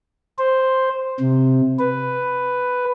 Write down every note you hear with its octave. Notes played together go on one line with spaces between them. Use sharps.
C5
C3
B4